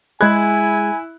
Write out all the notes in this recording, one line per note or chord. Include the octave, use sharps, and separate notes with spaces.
G#3 E4 G#4 G#5 B5 F#6 G#6